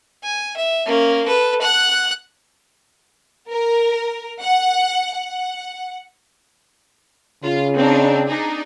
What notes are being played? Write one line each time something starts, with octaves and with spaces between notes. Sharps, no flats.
G#5
E5
A#3 C#4
A4 B4
F#5 F#6
A#4
F#5
F#5
C#3 F4
C4 D4 D#4
D4 D#4 G#4